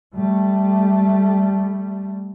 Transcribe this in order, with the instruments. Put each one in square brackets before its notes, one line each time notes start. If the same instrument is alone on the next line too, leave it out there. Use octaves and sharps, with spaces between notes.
[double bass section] G3 A3